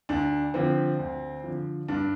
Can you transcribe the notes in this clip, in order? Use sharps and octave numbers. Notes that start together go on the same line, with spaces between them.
D2 D4
D3 F3 C4
D2
D3 F3
G2 D4